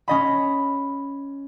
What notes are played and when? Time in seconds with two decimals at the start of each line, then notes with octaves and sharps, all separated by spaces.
0.08 C#4 D#5 B5